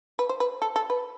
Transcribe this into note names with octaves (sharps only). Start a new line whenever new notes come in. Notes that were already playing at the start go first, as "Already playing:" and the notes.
B4
C5
B4
A4
A4
B4